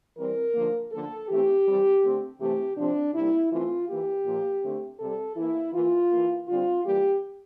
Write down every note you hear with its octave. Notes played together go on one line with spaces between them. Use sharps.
E3 G3 C4 A#4
D3 F3 A#3
D3 F3 A#3 A4
E3 A3 C4 G4
E3 G3 C4
D3 A3 C4
C3 E3 A3 C4 G4
C3 F3 C4 D4
C3 G3 A#3 E4
E3 A3 C4 F4
E3 A#3 G4
A#2 F3 A#3
D3 A3 C4
C3 G3 C4 A4
E3 A#3 E4
E3 A#3 F4
E3 A#3
D3 G3 C4 F4
E3 G3 A#3 G4